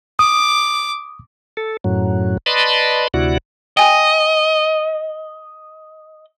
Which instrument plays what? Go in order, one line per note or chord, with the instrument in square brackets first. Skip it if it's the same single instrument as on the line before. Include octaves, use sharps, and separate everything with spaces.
[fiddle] D6 [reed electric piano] D#6
[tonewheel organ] A4
F#2 A2 F#3
B4 D5 D#5 A5 B5 C6
D2 C3 E4 F#4 D5 F#5
[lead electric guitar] D#5 [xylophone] G5 G#5